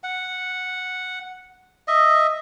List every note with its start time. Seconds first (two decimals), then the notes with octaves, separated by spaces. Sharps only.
0.03 F#5
1.88 D#5 E5